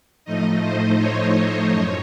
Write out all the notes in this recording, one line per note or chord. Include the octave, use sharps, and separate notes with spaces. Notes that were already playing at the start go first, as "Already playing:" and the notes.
A2 F3 A3 D#4 D#5
C5
C#5
F#2